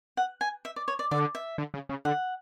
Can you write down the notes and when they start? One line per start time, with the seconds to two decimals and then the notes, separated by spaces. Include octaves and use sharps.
0.17 F#5
0.41 G#5
0.65 E5
0.76 D5
0.88 C#5
0.99 D5
1.11 D3 D5
1.35 E5
1.58 D3
1.74 C#3
1.89 C#3
2.05 D3 F#5